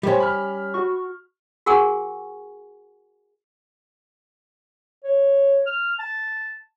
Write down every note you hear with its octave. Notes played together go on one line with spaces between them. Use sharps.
G3 C#4 G4 C5 C#5
B5 F6
F#4 C#6
F#4 G#4 A#4 F#5 G#5 C#6
C#5
F6
A5